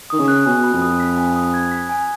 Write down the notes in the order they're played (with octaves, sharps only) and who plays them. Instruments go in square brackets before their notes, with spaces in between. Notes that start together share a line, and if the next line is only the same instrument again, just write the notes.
[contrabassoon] D#3 [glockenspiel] D#6
[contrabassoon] C#3
[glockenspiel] F#6
[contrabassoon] B2 [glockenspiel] G#5
[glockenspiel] B5
[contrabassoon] F2
[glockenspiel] D#6
B6
G#5
D#6
G#6
B6
G#5